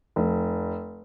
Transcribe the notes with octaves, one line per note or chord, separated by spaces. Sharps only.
F1